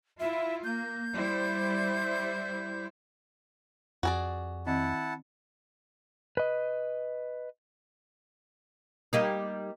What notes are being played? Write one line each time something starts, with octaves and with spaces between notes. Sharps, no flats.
E4 F4 E5
A#3 G6
G3 E4 C5
F2 F#4 G#4 D5
D#3 C4 E4 D#5 F#5 A5
B4 D#5
G3 A#3 D#4